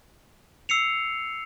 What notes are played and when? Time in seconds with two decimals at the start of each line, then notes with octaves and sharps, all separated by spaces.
0.69 E6 C7 C#7 F7